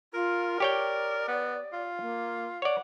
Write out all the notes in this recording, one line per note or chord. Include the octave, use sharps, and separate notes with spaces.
F4 A#4
G4 C#5 D5 G5
B3
F4
A#3
C#5 D5 F#5